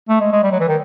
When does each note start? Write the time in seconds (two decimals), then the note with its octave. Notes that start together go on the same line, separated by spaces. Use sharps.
0.09 A3
0.20 G#3
0.32 G#3
0.43 G3
0.52 F#3
0.60 E3
0.68 D#3